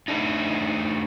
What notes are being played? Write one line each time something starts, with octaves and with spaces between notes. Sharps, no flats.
A3 D4 D#4